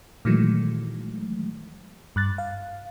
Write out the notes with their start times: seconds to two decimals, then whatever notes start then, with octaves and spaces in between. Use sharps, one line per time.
0.25 A#2 D#3 E3 F#3 G#3 A3
2.16 G2 F#6 A6
2.38 F5